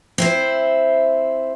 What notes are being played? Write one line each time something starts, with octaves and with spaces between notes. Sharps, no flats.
C4 E4 C5